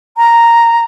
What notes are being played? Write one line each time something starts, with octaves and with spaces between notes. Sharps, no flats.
A#5